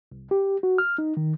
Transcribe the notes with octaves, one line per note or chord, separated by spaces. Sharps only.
C2
G4
F#4
F6
D#4
D#3